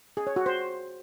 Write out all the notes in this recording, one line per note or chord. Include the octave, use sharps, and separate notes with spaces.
G#4
C#5
F#4
C5